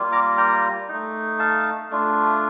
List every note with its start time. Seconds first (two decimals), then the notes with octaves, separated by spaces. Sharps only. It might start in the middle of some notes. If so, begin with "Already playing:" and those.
Already playing: G3 A#3 F4
0.12 A#5 D6
0.37 G5 A#5
0.89 A3 D#4
1.39 F5 A5
1.91 A3 D4 F4